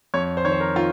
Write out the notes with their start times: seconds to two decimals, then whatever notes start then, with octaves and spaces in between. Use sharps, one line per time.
0.14 F2 C#5
0.37 C5
0.44 D#3 C#5
0.52 C5
0.60 A#4
0.76 D#3 F4